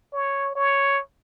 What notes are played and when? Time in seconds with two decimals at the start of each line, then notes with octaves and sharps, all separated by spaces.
0.13 C#5
0.55 C#5